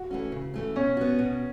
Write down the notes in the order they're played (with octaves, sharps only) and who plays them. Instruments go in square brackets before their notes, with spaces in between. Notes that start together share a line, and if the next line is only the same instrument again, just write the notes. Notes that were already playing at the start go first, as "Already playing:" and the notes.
Already playing: [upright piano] F#4
[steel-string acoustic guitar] E3 A3 C#4
C#3
E3 A3 C#4
[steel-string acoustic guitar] B2 [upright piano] C#4
[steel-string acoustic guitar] B3 F#4
B2